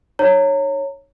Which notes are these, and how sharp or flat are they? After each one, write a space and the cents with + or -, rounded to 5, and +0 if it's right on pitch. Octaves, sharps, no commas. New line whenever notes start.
D#4 -40 C#5 -5 A#5 -30